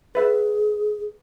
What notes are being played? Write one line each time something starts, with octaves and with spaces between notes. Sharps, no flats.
G#4 B4 E5